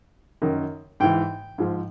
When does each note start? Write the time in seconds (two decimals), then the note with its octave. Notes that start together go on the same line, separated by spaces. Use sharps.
0.42 F#2 D#3
1.00 G#2 E3 G5
1.58 G#2 F3